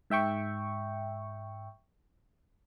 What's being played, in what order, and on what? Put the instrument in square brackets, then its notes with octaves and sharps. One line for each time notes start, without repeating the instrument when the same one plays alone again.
[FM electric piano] G#2 E5 G5 C#6